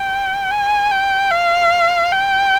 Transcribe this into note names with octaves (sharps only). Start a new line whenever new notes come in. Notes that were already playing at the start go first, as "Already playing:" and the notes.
Already playing: G5
G#5
G5
F5
G5